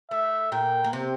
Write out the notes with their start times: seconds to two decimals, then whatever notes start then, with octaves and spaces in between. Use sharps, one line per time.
0.11 A3 E5
0.52 A#2 A#3 G5
0.84 A#3
0.93 C3 C4